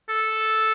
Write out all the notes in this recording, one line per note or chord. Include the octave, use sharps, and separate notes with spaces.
A4